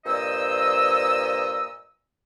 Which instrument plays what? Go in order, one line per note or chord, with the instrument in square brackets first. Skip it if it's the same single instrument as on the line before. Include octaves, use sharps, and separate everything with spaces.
[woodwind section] G2 A#2 C5 D#5 E6